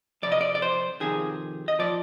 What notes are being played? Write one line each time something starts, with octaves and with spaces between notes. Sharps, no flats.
F2 C3 D5
D#5
D5
D5
C5
F2 C3 D#3 G#4
D#5
A#2 F3 D5